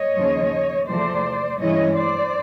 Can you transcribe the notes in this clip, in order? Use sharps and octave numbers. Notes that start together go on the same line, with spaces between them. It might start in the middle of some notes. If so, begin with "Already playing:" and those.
Already playing: C#5 D#5
D#2 C#3 F3
E2 C3 F3 A3 C4 C5 D5
G2 E3 G#3 C#4 E4 C#5 D#5
C5 D5